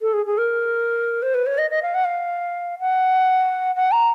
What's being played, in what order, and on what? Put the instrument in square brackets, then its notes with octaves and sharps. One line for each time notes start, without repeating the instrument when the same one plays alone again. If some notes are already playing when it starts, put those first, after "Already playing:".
[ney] A4
G#4
G#4
A#4
C5
B4
C#5
D#5
D#5
F5
F#5
F5
F#5
F#5
A#5